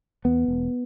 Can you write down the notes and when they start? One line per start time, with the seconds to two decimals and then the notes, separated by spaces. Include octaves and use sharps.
0.25 E2 B3
0.48 E1